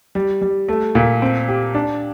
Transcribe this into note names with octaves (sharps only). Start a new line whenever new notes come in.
G3
G3
A3
A#2
C4
G4
D4